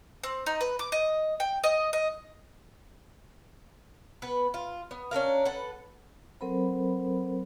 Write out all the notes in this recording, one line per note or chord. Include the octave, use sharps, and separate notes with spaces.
C4
D#4
B4
D6
D#5
G5
D#5
D#5
B3 B4
F4
B3
C#4 D4 A#4 F5
A4 B4 F#5
F#3 C4 A4 A#4 C5 B5